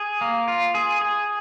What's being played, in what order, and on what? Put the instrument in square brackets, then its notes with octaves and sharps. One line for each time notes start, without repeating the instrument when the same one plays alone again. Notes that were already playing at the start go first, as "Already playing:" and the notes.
Already playing: [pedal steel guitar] G#4
A#3
F4
G#4
G#4